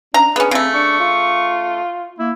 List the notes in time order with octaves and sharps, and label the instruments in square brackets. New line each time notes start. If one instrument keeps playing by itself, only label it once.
[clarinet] C#4 [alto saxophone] D4 [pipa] A#5
[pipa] B3 C#4 [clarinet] G#4
[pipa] C#3 A3 [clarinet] C4
[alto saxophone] D4 [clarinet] C#6
[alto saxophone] F4
[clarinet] A#3 [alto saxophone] E4